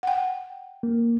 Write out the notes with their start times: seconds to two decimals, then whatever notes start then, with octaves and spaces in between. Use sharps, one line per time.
0.03 F#5 G5
0.83 A#3